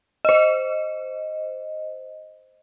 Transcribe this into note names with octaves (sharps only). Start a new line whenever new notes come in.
C5 D#5